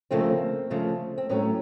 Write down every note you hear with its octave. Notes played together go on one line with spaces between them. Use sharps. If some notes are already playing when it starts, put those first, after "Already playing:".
D2 C#3 F3 A3 A#3 C4
D2 C#3 F3 A3
C4
A2 F#3 A3 B3 C#4